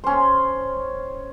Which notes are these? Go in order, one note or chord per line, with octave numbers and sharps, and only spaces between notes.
C#4 C5